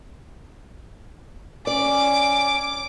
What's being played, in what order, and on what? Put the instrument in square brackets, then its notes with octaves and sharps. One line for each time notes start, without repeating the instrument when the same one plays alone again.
[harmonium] C#4 [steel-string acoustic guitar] D5 [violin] D6